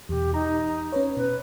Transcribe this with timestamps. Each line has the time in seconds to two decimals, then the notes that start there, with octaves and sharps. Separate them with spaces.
0.09 E2 B2 G4
0.34 D#4 A#5
0.92 C#4 B4 C#5
1.17 B2 B4